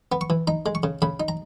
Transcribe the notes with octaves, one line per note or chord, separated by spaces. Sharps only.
B3
C#6
E3
D#4 A#5
G#3
C#6
C#3
C#3 B5
D#4
A#5